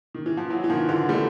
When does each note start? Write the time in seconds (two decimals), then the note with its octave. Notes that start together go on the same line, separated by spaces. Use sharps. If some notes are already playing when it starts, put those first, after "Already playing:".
0.14 D#3
0.26 E3
0.37 F3
0.50 E3 F#3
0.64 E3
0.70 D#3 F3
0.89 D3 E3
1.09 G3 A3